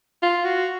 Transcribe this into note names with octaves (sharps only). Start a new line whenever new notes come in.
F4
F#4